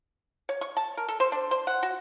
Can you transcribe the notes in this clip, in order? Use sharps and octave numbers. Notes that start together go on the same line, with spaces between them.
C#5
C#6
A5
A#4
A4
C5
D4
C5
F#5
F#4